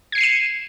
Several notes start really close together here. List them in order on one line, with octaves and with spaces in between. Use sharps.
G#6 C7 C#7 D#7 E7